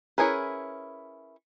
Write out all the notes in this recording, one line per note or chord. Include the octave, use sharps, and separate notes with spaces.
C#4 E4 G#4 A#4 B4